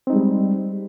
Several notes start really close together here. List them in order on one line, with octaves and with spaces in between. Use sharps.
C4 D#4 G#3 G3